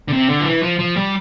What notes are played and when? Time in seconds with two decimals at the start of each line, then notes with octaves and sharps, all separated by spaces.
0.08 D3
0.12 C3
0.29 D3
0.40 F3
0.45 E3
0.63 F3
0.79 F3
0.96 G3